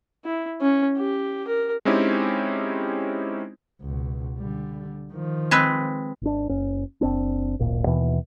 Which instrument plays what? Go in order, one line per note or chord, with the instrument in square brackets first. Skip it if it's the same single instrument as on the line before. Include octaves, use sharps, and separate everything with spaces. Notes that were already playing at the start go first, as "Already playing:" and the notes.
[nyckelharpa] E4
C#4
G4
A#4
[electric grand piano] G#3 C4 C#4 D#4 E4 G4
[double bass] C#2 B2
D3 G3
D#3 F3
[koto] G#3 C4 B4
[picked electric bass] G#1 D4
F#1 C#4
F#1 C4 D4
D1 G#1 A#2
D#2 B2 E3